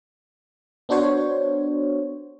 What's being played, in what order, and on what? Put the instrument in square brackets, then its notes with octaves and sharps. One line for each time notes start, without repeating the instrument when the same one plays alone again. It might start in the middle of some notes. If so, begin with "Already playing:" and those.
[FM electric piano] B3 D4 F#4 C5 C#5